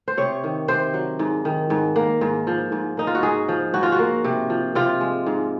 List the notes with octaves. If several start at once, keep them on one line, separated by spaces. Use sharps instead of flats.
C5
C3 C#5
D#3
C3 C5
F#3
G#2
D#3
G#2
A#3
G#2
F3
G#2
A#3 D#4
F4
F#4
G#2 G#4
F3
G#2 F#4
F4
F#4
A#3
C3
F3
C3 F4
G#3
G#2